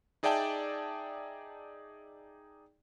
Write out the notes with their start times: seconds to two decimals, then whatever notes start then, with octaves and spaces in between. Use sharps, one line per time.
0.23 D#4 G#4 D5 E5 G5 A5